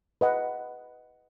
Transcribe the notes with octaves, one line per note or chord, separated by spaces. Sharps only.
B4 D#5 F#5